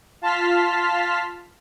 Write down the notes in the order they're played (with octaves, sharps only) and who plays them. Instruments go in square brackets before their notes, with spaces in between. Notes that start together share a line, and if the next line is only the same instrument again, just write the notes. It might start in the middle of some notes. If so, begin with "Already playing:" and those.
[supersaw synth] F4 A5 C6 F6 B6